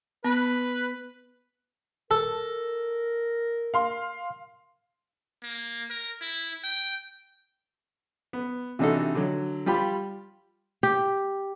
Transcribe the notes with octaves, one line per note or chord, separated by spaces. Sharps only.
B3 B4
A4 A#4
F5 C6
A#3
A#4
E4
G5
B3
C3 E3 D4 D#4 F#4 A4
D3 F#3
G3 F4 G4 B5
G4